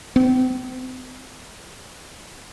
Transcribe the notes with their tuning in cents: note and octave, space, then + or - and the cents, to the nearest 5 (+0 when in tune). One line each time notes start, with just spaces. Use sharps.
C4 -40